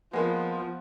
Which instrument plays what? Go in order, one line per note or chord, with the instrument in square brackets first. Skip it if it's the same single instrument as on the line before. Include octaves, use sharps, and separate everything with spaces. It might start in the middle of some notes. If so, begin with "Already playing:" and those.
[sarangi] F3 [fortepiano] G#3 A#3 [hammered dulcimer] B3